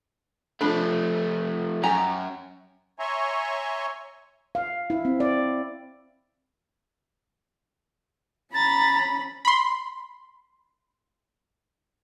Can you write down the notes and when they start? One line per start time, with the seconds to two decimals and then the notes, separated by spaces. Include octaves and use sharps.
0.61 F3 A3 D4 B5
1.84 F#2 G4 G#5 A#5
2.99 C#5 E5 G#5 A#5 C6 C#6
4.55 F5
4.90 E4
5.05 C4
5.20 D5
8.54 C#4 A#5 B5 A6
9.45 B5 C6